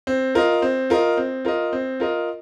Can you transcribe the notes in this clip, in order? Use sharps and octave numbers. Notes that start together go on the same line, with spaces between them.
C4
F4 A#4 D#5
C4
F4 A#4 D#5
C4
F4 A#4 D#5
C4
F4 A#4 D#5